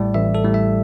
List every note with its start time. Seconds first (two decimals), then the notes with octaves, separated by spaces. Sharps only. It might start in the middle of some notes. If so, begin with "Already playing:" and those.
Already playing: A1 A2 G3 D5
0.14 A1 E5
0.35 A4
0.44 A2 G3
0.54 E5